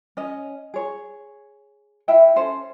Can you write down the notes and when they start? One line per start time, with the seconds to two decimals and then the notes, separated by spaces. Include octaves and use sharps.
0.17 C#4 D#5
0.74 G#4 C#5
2.08 E4 E5 F5 G5
2.36 C#4 A4 C5